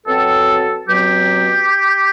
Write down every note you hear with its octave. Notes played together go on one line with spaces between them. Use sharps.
B2 F#3 C4 A4
B2 F#3 C4 G4